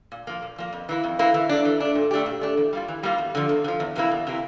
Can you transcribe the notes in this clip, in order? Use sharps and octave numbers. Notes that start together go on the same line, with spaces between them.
A#2
F3 A#3
A#2
F3 A#3
F2
E3 A#3 E4
F2
E3 A#3 E4
E3
A3 D4
E3
A3 D4
A#2
A3 D4 G4
A#2
A3 D4 G4
E3
G3 A#3 F4
E3
G3 A#3 F4
E2
D3 F3
E2
D3
F3
E2
C3 E3 A#3 E4
E2
C3 E3 A#3 E4